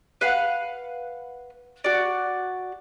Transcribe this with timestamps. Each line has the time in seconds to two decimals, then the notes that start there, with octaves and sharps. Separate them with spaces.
0.21 B4 F5 F#5
1.84 F#4 D5